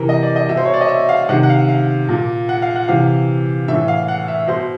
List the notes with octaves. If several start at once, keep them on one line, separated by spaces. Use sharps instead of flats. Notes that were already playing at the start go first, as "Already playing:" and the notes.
Already playing: C3 E3 A#4
D#5
D5
D#5
B2 E5
C5
C#5
D5
D#5
E5
F5
C3 D#3 F#5
F#5
F5
F5
A#2
F#5
F5
F#5
C3 E3 F5
A2 E3 E5
F5
F#5
E5
B2 C5